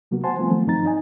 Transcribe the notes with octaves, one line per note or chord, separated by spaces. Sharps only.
C3 F#3 A#3 B3 F#4
C5 F#5 G#5 A5 C6
F3 G3 A3 B3 C4 F4
D#3 F3 F#3 A3 C4
G2 F3 C4 D#4 A#5 A6
D#4 D#5 G#5